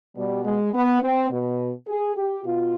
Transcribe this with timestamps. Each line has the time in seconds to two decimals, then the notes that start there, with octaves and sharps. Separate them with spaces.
0.16 B2 G3
0.45 G#3
0.74 B3
1.02 C4
1.31 B2
1.88 G#4
2.17 G4
2.44 B2 F4